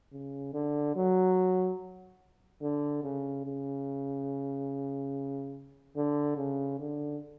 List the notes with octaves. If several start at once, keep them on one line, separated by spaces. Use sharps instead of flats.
C#3
D3
F#3
D3
C#3
C#3
D3
C#3
D3